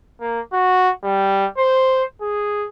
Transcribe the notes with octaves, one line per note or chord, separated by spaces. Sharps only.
A#3
F#4
G3
C5
G#4